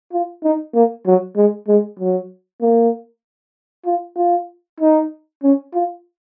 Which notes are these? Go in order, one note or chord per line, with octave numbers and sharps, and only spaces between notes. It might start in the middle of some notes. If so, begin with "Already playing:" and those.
F4
D#4
A#3
F#3
G#3
G#3
F#3
A#3
F4
F4
D#4
C#4
F4